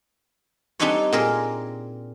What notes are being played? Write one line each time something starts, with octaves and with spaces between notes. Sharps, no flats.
G3 C4 D4 D#4 B4 C#5
A#2 C4 G#4 A#4